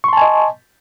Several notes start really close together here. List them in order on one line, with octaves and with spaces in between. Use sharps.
C#6 C6 A5 G#5 D#5